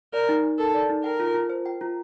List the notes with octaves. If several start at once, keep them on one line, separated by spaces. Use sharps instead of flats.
A#4 D5
D#4
D#4
A4 A#4
D5
D#4
A#4 G5
F4
F4
C5
G5
F4